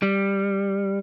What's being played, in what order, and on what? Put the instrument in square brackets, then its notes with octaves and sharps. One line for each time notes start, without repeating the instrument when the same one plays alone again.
[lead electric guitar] G3